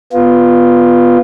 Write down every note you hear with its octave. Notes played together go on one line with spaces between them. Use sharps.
B3 F4